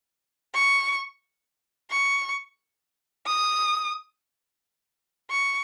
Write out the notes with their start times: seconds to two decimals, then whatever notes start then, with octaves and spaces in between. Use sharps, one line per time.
0.54 C#6
1.91 C#6
3.27 D#6
5.31 C#6